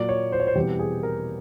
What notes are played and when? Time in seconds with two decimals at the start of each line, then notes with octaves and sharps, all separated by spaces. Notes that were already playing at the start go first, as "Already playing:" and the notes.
Already playing: A#2 F#3 A#3 D5
0.09 C#5
0.32 C5
0.40 C#5
0.47 C5
0.55 E2 B2 G3 C4 G4
0.79 G#4
1.03 A#4